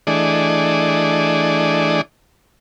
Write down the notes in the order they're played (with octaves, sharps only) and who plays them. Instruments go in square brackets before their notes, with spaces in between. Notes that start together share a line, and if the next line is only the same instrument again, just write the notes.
[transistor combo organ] E3 A3 D4 G#4 D5 D#5